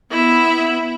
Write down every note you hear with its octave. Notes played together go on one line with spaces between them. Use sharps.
B3 E4 E5